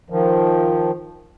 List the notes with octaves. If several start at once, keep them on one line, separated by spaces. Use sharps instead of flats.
D#3 F3